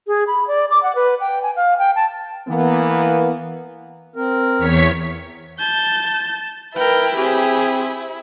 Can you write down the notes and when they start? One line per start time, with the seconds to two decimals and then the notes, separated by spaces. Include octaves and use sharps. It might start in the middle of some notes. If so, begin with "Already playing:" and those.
0.07 G#4
0.27 B5
0.47 D5
0.70 D6
0.83 F#5
0.95 B4
1.20 G5
1.43 G#5
1.56 F5
1.79 G5
1.96 A5
2.48 E3 A#3 B3
4.16 C4 A#4
4.59 E2 C#5 B6
5.59 A5 G6
6.76 E4 A#4 B4 G5
7.17 C4 G4 G#4